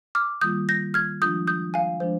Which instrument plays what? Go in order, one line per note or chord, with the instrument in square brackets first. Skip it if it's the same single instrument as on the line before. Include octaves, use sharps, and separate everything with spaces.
[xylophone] D6 F6
[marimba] D#3 G3 A#3 F4 [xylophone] D#6 G6
[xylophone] G6 A#6
F6 G#6
[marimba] F3 G#3 D4 F4 [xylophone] D#6 G6
[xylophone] D#6 G6
F5 G#5
[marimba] F3 G#3 D4 [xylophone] C5